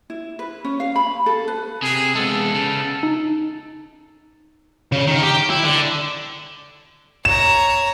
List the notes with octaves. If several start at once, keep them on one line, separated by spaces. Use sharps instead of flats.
E4
B4
C#4
F5
B5
A4
B4
C3 G#4
G#3 B3 A4
C#3
D#4
C#3
D#3
G4
G5
E4
D3
C#5 A#5 E7